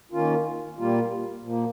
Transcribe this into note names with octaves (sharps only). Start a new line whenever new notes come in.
D#3 A#3 C#4 F4
A#2 G3 A#3 F4
A#2 F3 A#3